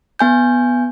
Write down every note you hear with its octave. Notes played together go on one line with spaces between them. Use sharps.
B3 G#5 G6